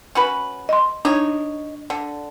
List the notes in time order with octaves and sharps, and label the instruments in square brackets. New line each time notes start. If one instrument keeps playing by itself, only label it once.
[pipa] C#4 F#4 B4
[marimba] D#5 C6
[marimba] D4 [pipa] D#4 C#5
[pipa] D3